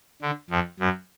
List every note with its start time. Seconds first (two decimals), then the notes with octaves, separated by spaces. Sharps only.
0.22 D3
0.50 F2
0.80 F#2